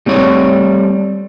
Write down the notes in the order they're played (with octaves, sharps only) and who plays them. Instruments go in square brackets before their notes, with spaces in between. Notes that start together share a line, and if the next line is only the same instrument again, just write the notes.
[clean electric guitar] G3 A3 C4 C#5